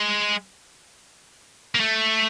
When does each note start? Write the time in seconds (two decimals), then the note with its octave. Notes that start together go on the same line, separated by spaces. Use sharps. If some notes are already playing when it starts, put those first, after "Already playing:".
Already playing: G#3
1.75 A#3
1.80 A3